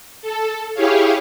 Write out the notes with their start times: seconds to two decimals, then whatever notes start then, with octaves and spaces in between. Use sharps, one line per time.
0.22 A4
0.74 E4 G4 G#4 C#5 F5